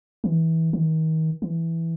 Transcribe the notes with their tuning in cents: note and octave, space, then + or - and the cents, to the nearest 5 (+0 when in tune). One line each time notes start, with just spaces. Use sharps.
E3 -25
D#3 +35
E3 +0